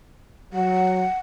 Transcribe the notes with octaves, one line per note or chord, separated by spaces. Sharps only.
F#3 F#5